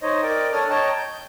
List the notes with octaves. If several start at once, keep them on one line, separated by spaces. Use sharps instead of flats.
D#4 C5 C#5 D#5
A#4 D5 D#5 G5 D6
D4 A4 C#5 D5 D#6 F6
C#5 D#5 G5 A5 A#5
G6